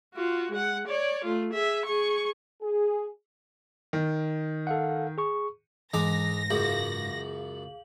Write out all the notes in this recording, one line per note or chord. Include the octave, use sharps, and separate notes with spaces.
F4 F#4
G#3 F#5
C#5 D5
A3 F4
G#4 E5
G#4 C#6
G#4
D#3
A4 F5 F#5
G#4 C#6
G#2 E3 G#3 A#5 D6 A#6
C#2 F#2 G#4 F5 F#7